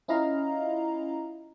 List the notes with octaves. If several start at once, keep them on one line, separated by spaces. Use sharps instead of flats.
C#4 E4 F4 D#5 F5 A#5